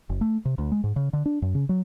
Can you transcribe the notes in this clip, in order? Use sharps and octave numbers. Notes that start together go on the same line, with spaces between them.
F#1
A3
C3
D2
G#3
G#2
C#3
D3
D4
F#2
C#3
F#3